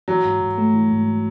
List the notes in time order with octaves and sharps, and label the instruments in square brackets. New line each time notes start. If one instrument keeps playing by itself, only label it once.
[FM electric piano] E3 [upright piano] F#3
[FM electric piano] G#2
G#2
A3
E3
G#2